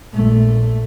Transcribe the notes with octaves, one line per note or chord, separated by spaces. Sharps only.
A#1 A3